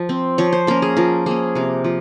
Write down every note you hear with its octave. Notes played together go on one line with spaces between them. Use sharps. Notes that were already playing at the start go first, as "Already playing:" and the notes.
Already playing: F3
C4
F3 C#5
C5
A#3 C#4 A#4
G#4
F3 A#4
A#3 C#4 G#4
C3 A#4
F3